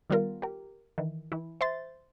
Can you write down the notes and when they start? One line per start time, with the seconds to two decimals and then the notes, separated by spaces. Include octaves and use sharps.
0.10 D#3 G3 B3 F4 A#4
0.42 G4 A#4
0.98 D#3 E3
1.32 E3 E4
1.61 C5 E5 C6 A6